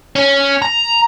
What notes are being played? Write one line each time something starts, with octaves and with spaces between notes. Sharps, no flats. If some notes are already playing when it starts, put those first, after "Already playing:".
C#4
A#5